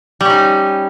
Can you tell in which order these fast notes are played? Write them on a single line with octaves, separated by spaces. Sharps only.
G3 C#4 D#4